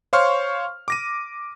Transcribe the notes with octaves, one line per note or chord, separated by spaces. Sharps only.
C5 C#5 F5 C6 C#6 F6
D6 A#6 D#7